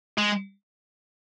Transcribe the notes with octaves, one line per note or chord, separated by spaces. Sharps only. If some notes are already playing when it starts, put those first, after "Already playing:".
G#3